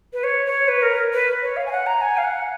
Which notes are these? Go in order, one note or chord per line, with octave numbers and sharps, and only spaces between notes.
B4
C#5
C#5
B4
A#4
B4
C#5
F5
G#5
F#5
A#5
G#5
F5
F#5